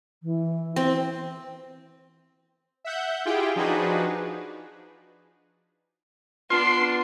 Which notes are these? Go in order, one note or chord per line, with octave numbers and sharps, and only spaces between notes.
E3
C4
E5 F#5 G6
E4 F4 G4 G#4 G5
F3 D4 D#4 F#4 G#4 B4
B3 D4 F4 C6